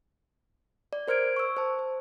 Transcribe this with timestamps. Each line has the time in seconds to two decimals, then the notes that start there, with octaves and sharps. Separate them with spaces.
0.93 D5
1.08 A#4 C5 F6 G#6 D7
1.37 C#6 E6
1.57 C5 A5
1.79 C5